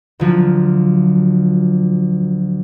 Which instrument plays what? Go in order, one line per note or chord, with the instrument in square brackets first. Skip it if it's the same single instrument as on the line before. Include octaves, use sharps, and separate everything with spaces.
[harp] D2 F3 F#3